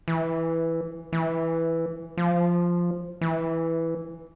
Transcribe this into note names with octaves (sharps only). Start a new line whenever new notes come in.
E3
E3
F3
E3